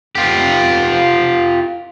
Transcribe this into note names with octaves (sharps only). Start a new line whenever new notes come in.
F4 G4